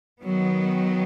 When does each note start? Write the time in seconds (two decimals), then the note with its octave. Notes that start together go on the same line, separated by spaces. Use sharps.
0.22 D#3 F#3 B3